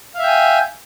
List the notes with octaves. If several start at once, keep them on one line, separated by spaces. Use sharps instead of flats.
E5 F5 G5 G#5